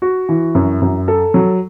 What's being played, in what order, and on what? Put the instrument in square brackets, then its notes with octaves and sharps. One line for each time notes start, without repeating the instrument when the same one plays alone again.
[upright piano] F#4
E3
F#2
F#2
A4
F#3